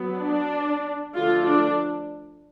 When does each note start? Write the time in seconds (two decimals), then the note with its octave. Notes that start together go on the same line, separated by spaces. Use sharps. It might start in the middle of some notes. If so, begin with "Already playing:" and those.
Already playing: F#3 B3
0.17 D4
1.14 D3 F3 A3 F4
1.46 D4